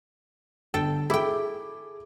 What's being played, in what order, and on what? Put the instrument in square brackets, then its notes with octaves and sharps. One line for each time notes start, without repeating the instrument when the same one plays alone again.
[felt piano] G1 [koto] A4 G5
[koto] E4 G5 [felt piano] G#4 A4 D6